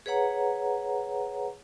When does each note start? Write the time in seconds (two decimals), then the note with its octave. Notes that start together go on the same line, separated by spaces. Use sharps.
0.06 G#4 B4 C#5 F#5 A#5